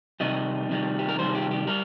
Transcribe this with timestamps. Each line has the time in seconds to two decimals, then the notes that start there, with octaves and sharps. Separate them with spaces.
0.20 C3 D#3 G3 D#5
0.69 C3 D#3 G3
0.99 G4
1.09 A#4
1.19 C3 D#3 G3 C5
1.35 G4
1.51 G4
1.67 G3 A#4